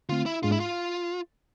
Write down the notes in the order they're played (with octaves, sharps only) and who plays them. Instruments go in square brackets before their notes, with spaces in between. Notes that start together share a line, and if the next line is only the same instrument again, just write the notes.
[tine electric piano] D3 A3 C4 [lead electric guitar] F4
[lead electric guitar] E4
[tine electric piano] G#2 G#3 D4 G#4 [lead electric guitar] F4
[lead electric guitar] E4
F4